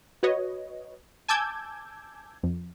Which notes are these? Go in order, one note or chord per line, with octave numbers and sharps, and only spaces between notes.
F#4 B4 C#5 D#5
G#5 A5 D6 E6 G6 G#6
F2